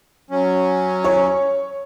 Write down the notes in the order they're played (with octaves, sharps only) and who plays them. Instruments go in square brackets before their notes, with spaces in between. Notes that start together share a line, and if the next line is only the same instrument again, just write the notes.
[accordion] F#3 C#4
[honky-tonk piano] C#5